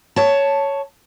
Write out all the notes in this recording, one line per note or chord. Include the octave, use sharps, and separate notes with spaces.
C#5 A5